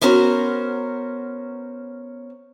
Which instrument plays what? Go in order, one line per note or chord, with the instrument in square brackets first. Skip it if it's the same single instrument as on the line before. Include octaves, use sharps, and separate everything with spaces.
[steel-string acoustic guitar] B3 C#4 F#4 A#4 C5